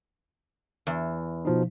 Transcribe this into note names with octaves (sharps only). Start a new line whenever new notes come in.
E2
B2 F3 D#4